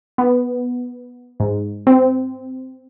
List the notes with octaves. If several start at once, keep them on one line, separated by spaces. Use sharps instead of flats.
B3
G#2
C4